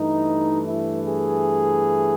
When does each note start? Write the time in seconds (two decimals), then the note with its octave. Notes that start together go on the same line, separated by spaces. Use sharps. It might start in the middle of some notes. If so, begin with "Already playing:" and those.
Already playing: G2 E3 A3 D#4
0.66 E4
1.06 G#4